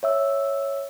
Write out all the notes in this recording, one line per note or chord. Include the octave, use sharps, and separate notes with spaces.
C#5 E5 E6